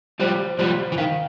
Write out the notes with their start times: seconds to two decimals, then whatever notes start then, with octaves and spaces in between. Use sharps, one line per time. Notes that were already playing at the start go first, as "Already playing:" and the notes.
0.20 F3 G3 C5
0.58 F3 G3 C5
0.92 E3
0.98 D#3 F5